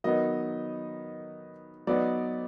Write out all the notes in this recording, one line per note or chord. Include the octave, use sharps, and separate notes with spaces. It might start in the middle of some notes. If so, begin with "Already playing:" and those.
D#3 F#3 B3 D#4 D#5
F#3 B3 D#4 D5